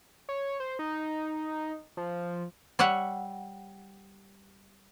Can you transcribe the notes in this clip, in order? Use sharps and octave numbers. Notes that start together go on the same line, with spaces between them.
C#5
C5
D#4
F3
G3 C#5 E5 F#5